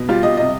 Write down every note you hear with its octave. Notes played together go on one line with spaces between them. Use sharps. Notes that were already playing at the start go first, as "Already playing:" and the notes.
Already playing: B2
G3 F4
G3 D#5
C3 D#5